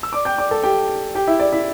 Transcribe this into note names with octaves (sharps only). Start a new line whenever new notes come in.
E6
D5 D6
G5 G6
D5 D6
A4 A5
G4 G5
G4 G5
E4 E5
D5
E4 E5